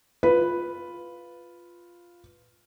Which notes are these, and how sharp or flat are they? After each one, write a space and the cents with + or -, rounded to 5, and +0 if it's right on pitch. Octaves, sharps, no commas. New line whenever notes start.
F4 +0 B4 +0